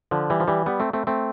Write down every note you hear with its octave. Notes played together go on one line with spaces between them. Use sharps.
D3 F3
E3 G3
F3
E3 G3
G3 B3
A3 C4
A3 C4
A3 C4